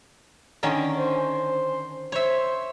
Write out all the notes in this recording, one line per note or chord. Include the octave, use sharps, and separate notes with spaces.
D3 D#3 C#4
C5
C5 C#5 E5